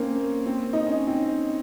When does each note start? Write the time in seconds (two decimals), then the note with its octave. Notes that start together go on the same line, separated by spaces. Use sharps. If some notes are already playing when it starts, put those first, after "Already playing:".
Already playing: A#3 C4 C#4
0.46 C4
0.73 D#4
0.87 C#4
1.07 C4